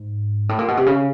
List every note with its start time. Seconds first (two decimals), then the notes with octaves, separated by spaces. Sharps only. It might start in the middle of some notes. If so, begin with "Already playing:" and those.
Already playing: G#2
0.49 A2
0.59 A#2
0.68 B2
0.77 C3
0.86 C#3